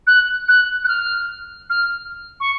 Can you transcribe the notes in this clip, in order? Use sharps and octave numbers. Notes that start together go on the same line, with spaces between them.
F#6
F#6
F#6
F6
F6
C#6